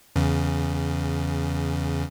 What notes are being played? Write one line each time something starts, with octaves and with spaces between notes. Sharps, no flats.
E2 C#3